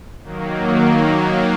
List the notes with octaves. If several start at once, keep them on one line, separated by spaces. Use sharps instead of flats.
D#3 F#3 A#3